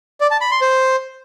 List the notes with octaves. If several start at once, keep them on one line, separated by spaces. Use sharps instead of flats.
D5
A5
B5
C6
C5